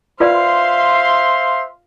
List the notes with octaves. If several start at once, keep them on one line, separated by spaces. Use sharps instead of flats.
F4 B4 C5 D5 E5 F5 C6